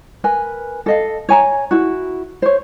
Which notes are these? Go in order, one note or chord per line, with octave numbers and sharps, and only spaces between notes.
A#4 B4 G#5
A4 D#5 F5
C#5 G#5 A#5
E4 F#4
C5 C#5